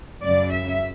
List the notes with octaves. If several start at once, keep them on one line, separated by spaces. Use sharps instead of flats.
F#2 C#3 F#3 D5
E5